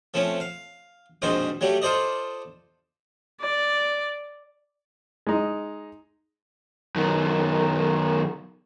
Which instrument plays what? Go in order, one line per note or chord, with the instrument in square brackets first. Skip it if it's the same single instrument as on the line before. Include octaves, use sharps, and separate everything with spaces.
[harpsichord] F3 A3 C4 C#4
F5
A#1 F2 G#2 B2 D#4 C5
F#3 G3 A3 G4
F4 A4 C5 D5 D#5
[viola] D5
[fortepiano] G#3 D#4
[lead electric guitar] F#2 D#3